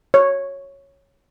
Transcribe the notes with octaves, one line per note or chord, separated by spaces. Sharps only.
C#5